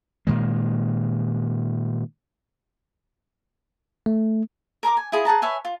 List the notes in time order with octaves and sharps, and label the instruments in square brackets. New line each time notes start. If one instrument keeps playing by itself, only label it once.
[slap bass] A#2 D#3 G#3
[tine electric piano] A3
[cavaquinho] A#4 A#5 C6 D6
G#5
E4 F4 G#4 D#5
G#4 F#5 A5 A#5
B4 C#5 E5 G#5
F4